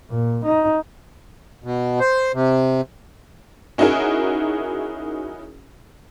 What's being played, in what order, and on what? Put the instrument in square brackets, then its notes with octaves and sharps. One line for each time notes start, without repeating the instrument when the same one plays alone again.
[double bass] A#2
D#4
[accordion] B2
C5
C3
[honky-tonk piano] C#4 D#4 E4 F#4 G#4 A#4